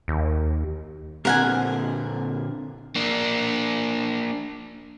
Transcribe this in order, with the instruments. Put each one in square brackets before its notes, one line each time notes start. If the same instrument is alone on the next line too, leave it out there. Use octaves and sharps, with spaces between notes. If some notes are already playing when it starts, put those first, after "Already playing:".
[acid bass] D#2
[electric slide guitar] A#2 D3 C4 [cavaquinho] A#4 F#5 G#5
[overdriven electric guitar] A#3 D4